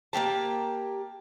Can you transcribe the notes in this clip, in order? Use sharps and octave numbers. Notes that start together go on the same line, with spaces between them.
A#3 E4 G4 A5